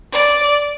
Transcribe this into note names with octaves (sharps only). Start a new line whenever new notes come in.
D5